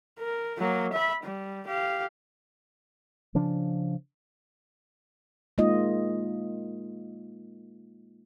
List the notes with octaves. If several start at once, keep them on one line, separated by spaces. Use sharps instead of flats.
A#4
F#3 A#3
E5 B5
G3
G4 F5
C#3 F3 D4
G#3 A#3 D#4 F4 D#5